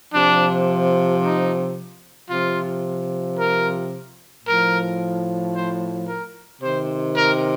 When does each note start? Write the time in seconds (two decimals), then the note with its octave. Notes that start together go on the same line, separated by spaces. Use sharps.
0.11 C3 F3 D4
1.20 D#4
2.28 C3 F3 F4
3.37 A#4
4.45 A2 F3 A#4
5.54 C5
6.07 A#4
6.61 C3 D#3 C5
7.15 A#4